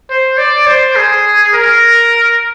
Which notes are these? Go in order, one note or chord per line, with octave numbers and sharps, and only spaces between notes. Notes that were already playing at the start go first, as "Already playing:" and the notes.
C5
D5
C5
G#4
A#4